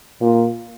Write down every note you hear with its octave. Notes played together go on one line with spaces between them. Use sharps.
A#2